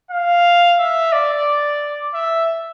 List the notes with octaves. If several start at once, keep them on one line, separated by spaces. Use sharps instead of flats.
F5
E5
D5
E5